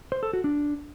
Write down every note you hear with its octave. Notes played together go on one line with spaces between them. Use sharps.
C5
A4
F#4
D4